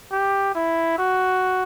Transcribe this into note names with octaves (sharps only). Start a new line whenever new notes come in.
G4
E4
F#4